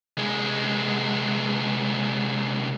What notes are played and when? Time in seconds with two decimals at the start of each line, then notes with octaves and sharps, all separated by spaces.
0.18 C2 G#3